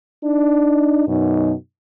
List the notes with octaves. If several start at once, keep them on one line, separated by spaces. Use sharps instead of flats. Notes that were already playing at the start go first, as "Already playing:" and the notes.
D4 D#4
F#2 B2 D#4